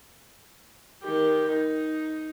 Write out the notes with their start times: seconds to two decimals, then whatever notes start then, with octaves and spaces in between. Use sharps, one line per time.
1.03 D#3 G4
1.52 D#4